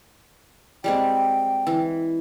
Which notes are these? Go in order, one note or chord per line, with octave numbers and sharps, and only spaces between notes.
G3 G#3 C4 G5
E3